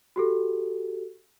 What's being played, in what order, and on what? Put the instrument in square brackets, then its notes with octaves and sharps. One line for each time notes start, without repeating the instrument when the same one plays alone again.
[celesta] F#4 G4 A4